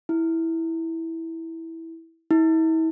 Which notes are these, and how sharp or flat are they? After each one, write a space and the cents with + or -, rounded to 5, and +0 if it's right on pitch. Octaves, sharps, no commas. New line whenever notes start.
E4 -10
E4 -40